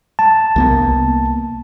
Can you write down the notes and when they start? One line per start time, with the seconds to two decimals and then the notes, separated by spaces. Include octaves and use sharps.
0.19 A5
0.56 C2 A#3 B3